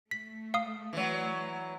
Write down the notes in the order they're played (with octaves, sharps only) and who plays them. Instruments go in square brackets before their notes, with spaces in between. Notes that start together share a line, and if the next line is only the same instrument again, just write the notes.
[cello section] A3 [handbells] B6
[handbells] F5 D#6
[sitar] E3 F#3